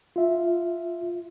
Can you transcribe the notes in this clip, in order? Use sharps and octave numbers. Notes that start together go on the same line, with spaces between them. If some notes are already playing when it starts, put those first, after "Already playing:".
F4 E5